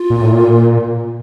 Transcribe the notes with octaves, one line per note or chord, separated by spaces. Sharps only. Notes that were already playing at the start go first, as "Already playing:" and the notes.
Already playing: F4
A#2
A2
A#2